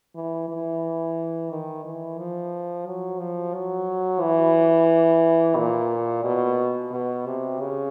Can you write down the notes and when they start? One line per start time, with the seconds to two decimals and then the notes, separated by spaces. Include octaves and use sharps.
0.15 E3
0.49 E3
1.50 D#3
1.85 E3
2.18 F3
2.86 F#3
3.20 F3
3.54 F#3
4.21 E3
5.57 A#2
6.25 B2
6.92 B2
7.27 C3
7.60 C#3